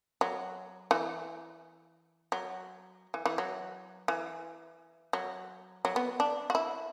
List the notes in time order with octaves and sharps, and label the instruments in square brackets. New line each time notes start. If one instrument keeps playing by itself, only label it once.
[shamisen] F#3
E3
F#3
E3
E3
F#3
E3
F#3
F#3
B3
D4
F#4
E4